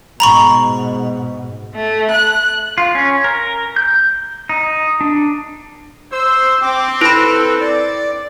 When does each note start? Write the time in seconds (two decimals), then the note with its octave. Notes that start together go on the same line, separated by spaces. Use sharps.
0.20 G#2 B2 A#5 B5 C#6
1.75 A3
2.12 F#6
2.78 F4
2.95 C#4
3.24 A#4
3.76 G6
4.49 D#4
5.01 D4
6.12 C5 E6
6.62 C4 G5 D6
7.01 E4 A4 B4 B5
7.60 D5